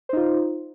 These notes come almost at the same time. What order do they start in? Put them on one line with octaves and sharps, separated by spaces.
C5 D#4 F4